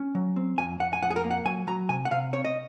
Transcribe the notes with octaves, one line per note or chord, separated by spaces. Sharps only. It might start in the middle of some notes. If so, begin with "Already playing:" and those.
Already playing: C#4
F#3
C4
F2 G#5
F2 F#5
G#5
F2 F#5
G#4
A#4
A#3
F#5
F#3 G#5
F#3 A#5
C3 G#5
F#5
C3 F5
C4 C#5
D#5